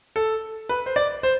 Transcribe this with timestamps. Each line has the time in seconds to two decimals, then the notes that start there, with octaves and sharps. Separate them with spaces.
0.16 A4
0.69 B4
0.86 C5
0.96 D5
1.23 C5